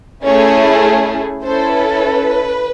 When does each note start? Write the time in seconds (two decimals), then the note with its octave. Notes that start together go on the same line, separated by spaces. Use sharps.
0.24 A3 C#4 E4 G#4 C#5
1.43 C#4 E4 A4 C5
1.73 B4